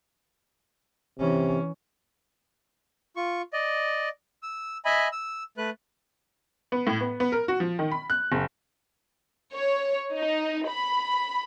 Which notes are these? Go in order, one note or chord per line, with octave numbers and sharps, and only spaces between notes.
C3 E3 C#4
F4 C#6
D5 D#5
E6
D#5 E5 G#5 B5
E6
A3 B4 F#6
B3
A2
B3
B3
A#4
F#4
F3
D#3
B5
F#6
F#1
C#5
D#4
B5